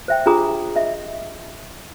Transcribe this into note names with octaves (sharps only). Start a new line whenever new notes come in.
C5 E5 G5
D4 F4 G4 G#4 A#5 D#6
D#5 E5